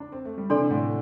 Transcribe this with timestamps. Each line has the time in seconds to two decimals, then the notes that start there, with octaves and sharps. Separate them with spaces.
0.00 D4
0.12 C4
0.25 A3
0.38 G3
0.50 C3 E3 D4 A4 D5 C6
0.70 A2 D3